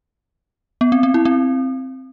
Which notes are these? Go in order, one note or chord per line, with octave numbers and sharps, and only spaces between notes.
B3
C4
C4
E4
C4